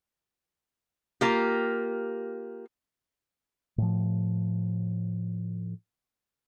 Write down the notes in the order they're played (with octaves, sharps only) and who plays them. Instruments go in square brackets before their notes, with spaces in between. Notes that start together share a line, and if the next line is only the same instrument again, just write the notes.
[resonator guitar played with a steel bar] A#3 F4 G4
[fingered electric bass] A2 F3